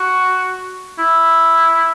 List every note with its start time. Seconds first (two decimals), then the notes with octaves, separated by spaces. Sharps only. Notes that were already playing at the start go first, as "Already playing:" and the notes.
Already playing: F#4
0.99 E4